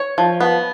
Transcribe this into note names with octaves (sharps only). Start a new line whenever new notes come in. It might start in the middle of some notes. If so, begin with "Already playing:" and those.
Already playing: C#5
F3
B3